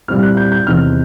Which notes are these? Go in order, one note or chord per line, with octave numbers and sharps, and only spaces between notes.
A#2 G3 C4 E4 F6
F#6
G6
G6
E2 C3 D#3 F6